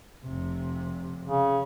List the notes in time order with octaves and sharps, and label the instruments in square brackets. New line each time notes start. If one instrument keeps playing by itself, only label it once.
[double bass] F1 C3
[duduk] C#3